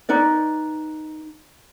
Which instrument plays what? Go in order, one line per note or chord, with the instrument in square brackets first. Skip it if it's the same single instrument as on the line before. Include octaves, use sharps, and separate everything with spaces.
[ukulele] D#4 B4 D5